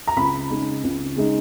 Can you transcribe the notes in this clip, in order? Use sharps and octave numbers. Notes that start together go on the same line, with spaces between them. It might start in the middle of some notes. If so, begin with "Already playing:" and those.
A#5
C#2 B5
C#3 G#3 D#4
C#2
C#3 G#3 D#4